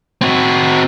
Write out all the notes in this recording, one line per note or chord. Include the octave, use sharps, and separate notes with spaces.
C4 F#4